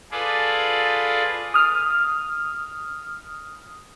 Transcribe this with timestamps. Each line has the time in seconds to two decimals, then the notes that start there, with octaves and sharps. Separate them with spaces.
0.11 F4 G#4 A4 B4 D5
1.54 D#6 F6